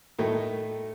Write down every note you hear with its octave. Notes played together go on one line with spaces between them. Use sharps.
A2 D#3 A3